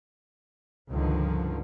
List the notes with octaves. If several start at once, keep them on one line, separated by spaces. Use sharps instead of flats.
C#2 G2 D3 D#3 F3